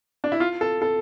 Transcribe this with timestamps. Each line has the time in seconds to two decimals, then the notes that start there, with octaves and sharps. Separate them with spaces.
0.24 D4
0.32 E4
0.40 F4
0.61 A4
0.82 A4